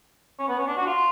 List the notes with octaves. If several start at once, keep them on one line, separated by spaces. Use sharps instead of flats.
C#4
B3
C#4
D4
F#4
F4